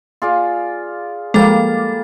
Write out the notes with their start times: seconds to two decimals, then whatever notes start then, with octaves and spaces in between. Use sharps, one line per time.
0.22 F4 G#4 D5
1.34 F3 G3 G#3 A#3 A4 A6